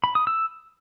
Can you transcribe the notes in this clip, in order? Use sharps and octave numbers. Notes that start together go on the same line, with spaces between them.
B5
D#6
E6